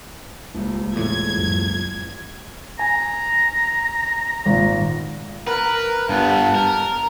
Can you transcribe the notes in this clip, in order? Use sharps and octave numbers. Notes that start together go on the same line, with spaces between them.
D#1 C#2
E2 A2 G#6
F#2
G#5 A#5
G#1 A#2
A#4 B4
G2 B3 A5
A#4